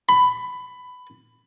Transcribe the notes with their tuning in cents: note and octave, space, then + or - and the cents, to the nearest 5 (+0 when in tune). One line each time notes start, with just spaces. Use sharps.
B5 +15